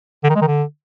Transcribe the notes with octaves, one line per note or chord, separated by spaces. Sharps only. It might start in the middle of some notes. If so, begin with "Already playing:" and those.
D3
D#3
G#3
D#3
D3